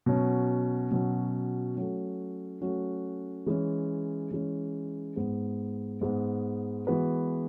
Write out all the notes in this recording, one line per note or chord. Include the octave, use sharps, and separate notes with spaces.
B2 F#3 C#4
B2 F#3 C#4
F#3 A3 C#4 F#4
F#3 A3 C#4 F#4
E3 G#3 C#4
E3 G#3 C#4
G#2 G#3 B3
G#2 G#3 B3
E3 G#3 B3 F#4 B4